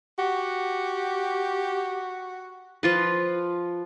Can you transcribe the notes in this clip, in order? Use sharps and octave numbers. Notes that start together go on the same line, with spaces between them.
F#4 G4
F3 F4 B4